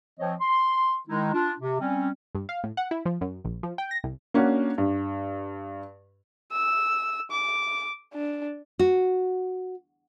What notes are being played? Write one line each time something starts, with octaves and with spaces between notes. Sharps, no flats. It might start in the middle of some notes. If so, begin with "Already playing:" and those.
F3 C4 C#5 D#5
C6
D#3 G#3 D#4 E4
D4 F4
C3
G3 C4 C#4
G2
F5
A2
F#5
E4
F3
F#2
A#1
F3
G5
A#6
C2
A#3 C#4 D4 F#4
G2
E6
D6
D4
F#4